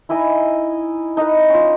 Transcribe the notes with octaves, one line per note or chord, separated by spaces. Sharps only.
D#4 E4 D#5 G#5
D#4 B4
C#4 F4